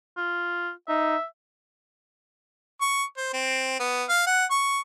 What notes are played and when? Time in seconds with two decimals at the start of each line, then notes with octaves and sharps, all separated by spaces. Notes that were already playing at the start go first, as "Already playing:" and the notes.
0.17 F4
0.88 D#4 E5
2.81 C#6
3.17 C5
3.33 C4
3.80 B3
4.09 F5
4.27 F#5
4.51 C#6